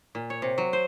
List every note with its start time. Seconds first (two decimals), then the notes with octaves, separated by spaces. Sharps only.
0.15 A#2
0.30 C#5
0.42 C3
0.58 F#3
0.73 C5